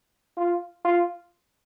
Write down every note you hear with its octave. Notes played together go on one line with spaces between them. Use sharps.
F4
F4